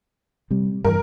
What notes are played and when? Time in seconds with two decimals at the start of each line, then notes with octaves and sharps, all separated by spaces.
0.51 C3 G3
0.84 G2 E3 A#4